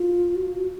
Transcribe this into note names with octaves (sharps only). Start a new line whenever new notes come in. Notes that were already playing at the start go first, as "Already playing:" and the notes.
Already playing: F4
F#4